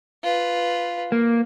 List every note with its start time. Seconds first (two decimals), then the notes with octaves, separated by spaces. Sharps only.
0.23 F4 B4
1.12 A#3